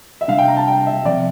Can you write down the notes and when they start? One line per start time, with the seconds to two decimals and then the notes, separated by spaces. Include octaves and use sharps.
0.21 E5
0.28 C3 G3 D4 F5
0.38 G5
0.48 A#5
0.57 A5
0.68 G5
0.87 E5
1.05 C3 F3 C4 D5